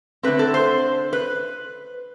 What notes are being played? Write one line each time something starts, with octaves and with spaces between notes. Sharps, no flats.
D3 A3 C4 B4
A4
C5
B4